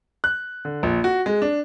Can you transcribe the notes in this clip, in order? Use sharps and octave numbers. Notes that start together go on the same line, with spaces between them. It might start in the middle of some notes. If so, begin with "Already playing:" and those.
F#6
D3
A#1
F#4
G#3
D4